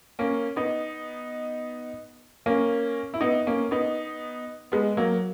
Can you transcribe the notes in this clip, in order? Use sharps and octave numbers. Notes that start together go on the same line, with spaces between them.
A#3 C#4
B3 D#4
A#3 C#4
E4
B3 D#4
A#3 C#4
B3 D#4
G#3 B3
F#3 A#3